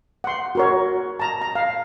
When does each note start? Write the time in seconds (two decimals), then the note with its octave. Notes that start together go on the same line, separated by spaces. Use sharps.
0.24 F#5 C6
0.55 F#4 A#4 C#5
1.20 A5 A#5
1.42 A#5
1.55 F5